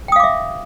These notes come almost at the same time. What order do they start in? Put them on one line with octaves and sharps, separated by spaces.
G5 D#6 F5 D6 E5